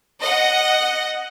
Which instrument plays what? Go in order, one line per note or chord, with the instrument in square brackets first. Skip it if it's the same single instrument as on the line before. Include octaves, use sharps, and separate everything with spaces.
[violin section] D#5 F#5